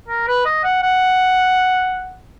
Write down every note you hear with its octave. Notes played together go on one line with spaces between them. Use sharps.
A#4
B4
D#5
F#5
F#5